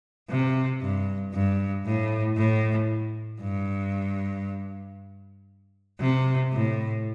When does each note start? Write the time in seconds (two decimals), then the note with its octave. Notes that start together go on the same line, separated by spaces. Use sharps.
0.30 C3
0.82 G2
1.34 G2
1.85 A2
2.37 A2
3.41 G2
6.00 C3
6.53 A2